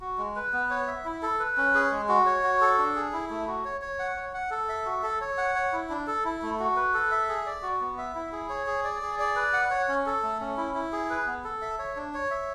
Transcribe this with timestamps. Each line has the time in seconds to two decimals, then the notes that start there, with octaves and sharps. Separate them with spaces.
0.01 F#4
0.18 G#3
0.36 B4
0.53 B3
0.70 C#5
0.87 E5
1.05 E4
1.22 A4
1.40 B4
1.57 C#4
1.75 G#4
1.92 G#3
2.09 F#4
2.26 C#5
2.44 F#4
2.61 A4
2.78 D4
2.96 G#4
3.13 E4
3.30 A3
3.47 F#4
3.65 C#5
3.81 C#5
3.99 F#5
4.16 C#5
4.34 F#5
4.51 A4
4.69 E5
4.86 F#4
5.03 A4
5.21 C#5
5.38 F#5
5.55 C#5
5.73 E4
5.90 D4
6.07 A4
6.25 E4
6.42 A3
6.60 F#4
6.76 B4
6.94 A4
7.11 E5
7.29 G#4
7.46 D5
7.63 F#4
7.81 B3
7.98 E5
8.15 E4
8.32 G#4
8.49 C#5
8.67 G#4
8.84 D5
9.02 G#4
9.19 D5
9.36 B4
9.53 F#5
9.71 C#5
9.89 C#4
10.06 A4
10.23 A3
10.41 C#4
10.57 E4
10.75 E4
10.93 G#4
11.10 B4
11.27 B3
11.44 A4
11.62 E5
11.79 C#5
11.96 D4
12.14 C#5
12.31 E5